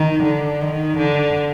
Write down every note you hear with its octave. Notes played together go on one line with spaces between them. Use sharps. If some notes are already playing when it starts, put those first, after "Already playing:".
Already playing: D#3
D3
D#3
D3